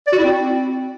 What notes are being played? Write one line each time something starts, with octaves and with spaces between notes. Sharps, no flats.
D5
F#4
E4
C4